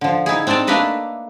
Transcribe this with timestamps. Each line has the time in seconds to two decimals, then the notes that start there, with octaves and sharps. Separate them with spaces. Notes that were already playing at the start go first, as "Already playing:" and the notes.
0.01 D3 F3
0.26 D#4 E4 G#4
0.47 C4 D4 D#4 D5 A5
0.67 A3 A#3 D4 A4 B4 D#5